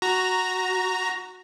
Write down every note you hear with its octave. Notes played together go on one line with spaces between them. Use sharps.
F#4 A#5 A#6